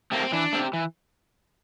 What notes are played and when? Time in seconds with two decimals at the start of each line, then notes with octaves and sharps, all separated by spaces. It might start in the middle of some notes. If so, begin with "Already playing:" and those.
0.12 A3 A#3 C4 G4
0.23 C4
0.32 E3 D4
0.53 A3 C4 G4
0.73 E3